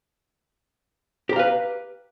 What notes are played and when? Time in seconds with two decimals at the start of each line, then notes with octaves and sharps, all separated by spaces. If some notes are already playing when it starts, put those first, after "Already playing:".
1.29 G4
1.33 A#5
1.36 F5
1.39 B4